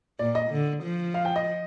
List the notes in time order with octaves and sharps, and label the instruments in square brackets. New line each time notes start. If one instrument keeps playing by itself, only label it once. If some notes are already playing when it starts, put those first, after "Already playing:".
[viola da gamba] A#2 [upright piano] D5
[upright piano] D#5
[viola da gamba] D3
F3
[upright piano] F5
G5
D#5